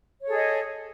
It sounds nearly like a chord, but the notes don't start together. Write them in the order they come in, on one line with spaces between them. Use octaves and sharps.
C#5 A4 G#4 D#5